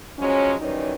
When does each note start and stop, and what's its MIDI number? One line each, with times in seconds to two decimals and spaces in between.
0.19 0.55 53
0.19 0.55 54
0.19 0.55 56
0.19 0.55 61
0.60 0.95 51
0.60 0.95 52
0.60 0.95 54
0.60 0.95 55
0.60 0.95 61
0.60 0.95 63